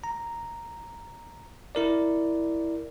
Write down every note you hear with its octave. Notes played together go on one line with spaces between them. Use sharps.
A#5
E4 A#4 D5